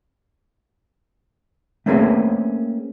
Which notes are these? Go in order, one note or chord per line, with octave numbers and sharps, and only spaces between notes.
A3 A#3 C4 C#4 G#4 B4